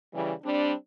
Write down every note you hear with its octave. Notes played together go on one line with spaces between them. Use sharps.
C#3 E3 G3
G3 C4 D4